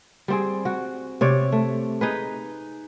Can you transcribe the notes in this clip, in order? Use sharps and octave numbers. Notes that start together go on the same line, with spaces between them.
G3 C4 G#4
F#4
C3 C#5 D5
A3
D#4 G#4 B4